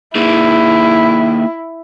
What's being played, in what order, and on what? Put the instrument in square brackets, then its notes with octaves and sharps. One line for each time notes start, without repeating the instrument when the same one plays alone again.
[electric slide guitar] A#3 D#4 G#4 [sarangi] E4